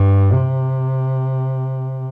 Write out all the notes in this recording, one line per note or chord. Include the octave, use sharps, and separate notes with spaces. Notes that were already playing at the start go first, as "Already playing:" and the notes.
Already playing: G2
C3